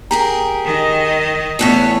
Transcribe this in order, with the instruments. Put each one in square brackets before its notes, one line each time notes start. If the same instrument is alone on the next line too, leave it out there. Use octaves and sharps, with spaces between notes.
[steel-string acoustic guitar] G4 G#4 A#4 [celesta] A#5
[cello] D#3 D#5
[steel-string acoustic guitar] E2 A2 C#5 [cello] B3 C#4